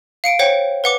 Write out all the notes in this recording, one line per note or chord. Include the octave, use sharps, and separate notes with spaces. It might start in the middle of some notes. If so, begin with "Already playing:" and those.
F5 C#7 D7
C5 C#5 F#5 G5
B4 F#5 D6